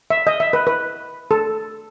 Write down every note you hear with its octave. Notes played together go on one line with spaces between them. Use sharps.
E5
D#5
E5
B4
B4
A4